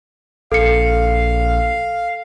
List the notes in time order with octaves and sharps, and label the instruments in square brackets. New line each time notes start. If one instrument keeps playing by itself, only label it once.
[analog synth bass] A#1 [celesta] A4 C#7 [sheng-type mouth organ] F5